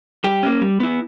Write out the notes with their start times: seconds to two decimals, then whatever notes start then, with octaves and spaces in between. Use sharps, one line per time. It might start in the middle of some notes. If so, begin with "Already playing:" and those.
0.24 G3 G4
0.43 A#3 C#4
0.61 G3
0.80 B3 E4